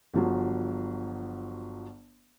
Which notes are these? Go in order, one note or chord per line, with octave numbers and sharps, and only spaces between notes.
G1 F3 F#3